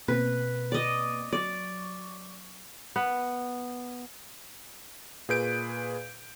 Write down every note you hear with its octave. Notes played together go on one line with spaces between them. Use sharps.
B2 A#3 C4 B4
D5 D#5
F#3 D5 C#6
B3
A#2 G#4 B4 G6 D7